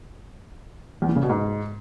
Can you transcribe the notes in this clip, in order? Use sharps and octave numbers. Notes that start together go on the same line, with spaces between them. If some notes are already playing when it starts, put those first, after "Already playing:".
E2
E3
C#3
B2
G#2